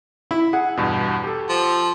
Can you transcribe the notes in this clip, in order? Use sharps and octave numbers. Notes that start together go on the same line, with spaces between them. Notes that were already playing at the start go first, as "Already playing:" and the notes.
E4 B5
G#4 F#5
E2 G2 B2
G4 A4
F3